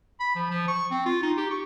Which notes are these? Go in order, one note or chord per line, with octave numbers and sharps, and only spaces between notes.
B5
F3
F3
C#6
C4
F4
D#4
G4
C#6